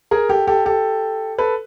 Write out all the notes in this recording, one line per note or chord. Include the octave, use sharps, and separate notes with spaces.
G#4 A#4
G4 A4
G4 A4
G4 A4
A4 B4